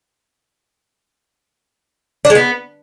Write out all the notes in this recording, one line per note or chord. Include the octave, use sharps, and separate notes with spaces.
D4
G#3
B3